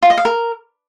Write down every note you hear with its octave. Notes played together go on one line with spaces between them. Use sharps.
F4
D#5
F5
A#4